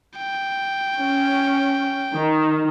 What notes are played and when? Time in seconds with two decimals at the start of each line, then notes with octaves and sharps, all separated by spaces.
0.17 G5
0.98 C#4
2.14 D#3